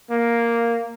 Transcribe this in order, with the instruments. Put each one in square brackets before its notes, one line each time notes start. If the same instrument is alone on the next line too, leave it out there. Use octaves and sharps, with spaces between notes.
[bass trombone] A#3